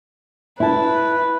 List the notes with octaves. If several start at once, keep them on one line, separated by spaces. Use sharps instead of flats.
E4 B4 A5